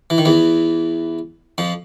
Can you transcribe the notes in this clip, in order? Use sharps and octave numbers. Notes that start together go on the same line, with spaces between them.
E3
D#3
E2 E3
F2 F3